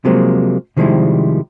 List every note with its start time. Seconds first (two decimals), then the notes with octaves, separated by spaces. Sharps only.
0.05 C3 F3 F#3 G#3 A#3
0.77 C3 D#3 F3 G3 G#3 E4